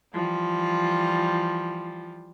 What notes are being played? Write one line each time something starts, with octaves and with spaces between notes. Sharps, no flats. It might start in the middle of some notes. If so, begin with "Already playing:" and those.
E3 F3 G3 F4